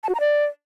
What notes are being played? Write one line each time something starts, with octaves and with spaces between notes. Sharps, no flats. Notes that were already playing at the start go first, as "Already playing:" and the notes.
A5
F#4
A#5
D5